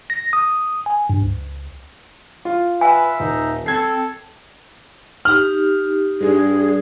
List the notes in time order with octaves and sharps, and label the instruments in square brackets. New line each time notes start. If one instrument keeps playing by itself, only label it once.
[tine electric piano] A#6
D#6
G#5
G2
C#2
[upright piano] F4
[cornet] B4 [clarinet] E5 [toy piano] G#5
[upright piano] D#1 [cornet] D#4
[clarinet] C4 [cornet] A4 [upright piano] G#6 C7
[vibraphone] D#4 G4 [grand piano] F6
[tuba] G2 [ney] G#4